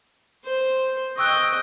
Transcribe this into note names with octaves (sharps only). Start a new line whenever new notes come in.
C5
D#5 G5 C#6 E6 F#6